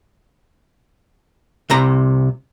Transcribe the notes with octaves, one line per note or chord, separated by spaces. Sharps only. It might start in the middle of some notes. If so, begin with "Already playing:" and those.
C2 C3 A#5